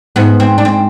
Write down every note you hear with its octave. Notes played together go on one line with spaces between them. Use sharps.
G#2 B3
C4
D4
C4